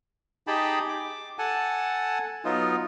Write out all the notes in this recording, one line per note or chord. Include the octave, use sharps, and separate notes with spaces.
D#4 G4 G#4 G5 A5 B5
D6
A4 F#5 G#5 A5
F#3 B3 D#4 F4